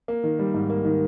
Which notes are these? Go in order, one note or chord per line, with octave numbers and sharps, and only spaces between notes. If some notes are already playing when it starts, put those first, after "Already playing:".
A#3
D#3
G3
G#2
A#3
D#3